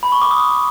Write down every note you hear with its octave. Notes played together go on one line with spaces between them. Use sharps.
B5
C#6
D6
D#6